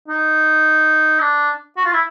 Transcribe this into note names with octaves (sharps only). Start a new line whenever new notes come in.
D#4
D4
F#4
F4
E4